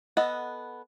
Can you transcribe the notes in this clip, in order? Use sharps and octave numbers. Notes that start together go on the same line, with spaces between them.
B3 A4 D#5 F#5